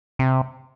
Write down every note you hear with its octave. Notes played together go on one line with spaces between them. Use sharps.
C3